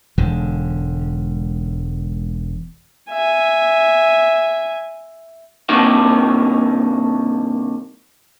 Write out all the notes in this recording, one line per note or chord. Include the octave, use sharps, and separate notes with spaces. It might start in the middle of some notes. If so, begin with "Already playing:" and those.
E1 G#2 D3
E5 G#5
G2 C3 D#3 A#3 F#4